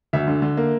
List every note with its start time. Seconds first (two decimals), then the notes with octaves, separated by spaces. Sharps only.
0.13 D2 E5
0.28 D3
0.42 D3
0.57 A#3